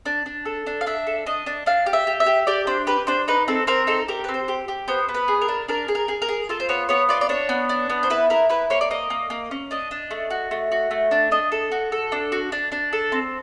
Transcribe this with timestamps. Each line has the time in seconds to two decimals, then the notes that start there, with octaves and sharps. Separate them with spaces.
0.06 D4
0.26 D4
0.45 A4
0.66 D4
0.81 F5
0.86 D4 E5
1.07 A4
1.26 D4 D#5
1.46 D4
1.66 D4 F5
1.86 G4
1.93 E5
2.07 G4
2.20 E5
2.26 G4
2.47 G4 D5
2.67 D4 C5
2.87 G4 B4
3.07 D4 C5
3.28 D#4 B4
3.48 C4 A4
3.67 C4 A#4
3.87 D#4 A4
4.08 G4 A#4
4.24 C4 B4
4.34 C5
4.48 G4
4.68 G4
4.88 B3 C5
5.09 B3
5.14 B4
5.28 G#4
5.42 A#4
5.48 D4
5.68 D4 A#4
5.88 G#4
5.95 A#4
6.08 G#4
6.22 A#4
6.29 G#4
6.49 F4 A4
6.60 C5
6.69 B3 C#5
6.89 B3 C#5
7.09 F4 D5
7.21 D5
7.29 D4 C#5
7.49 B3
7.69 D4
7.90 B3
8.03 C5
8.10 E4 B4
8.30 E4 A#4
8.49 E4 B4
8.70 A#3 C#5
8.81 D5
8.91 A#3 D#5
9.10 A#3
9.30 A#3
9.51 C#4
9.71 D4 D#5
9.91 D4
10.11 A3
10.30 F#4
10.51 A3
10.72 F#4
10.91 A3
11.11 D4
11.31 D4 D#5
11.52 A4
11.72 F#4
11.92 A4
12.12 D4
12.32 F#4
12.52 D4
12.72 D4
12.93 A4
13.12 C4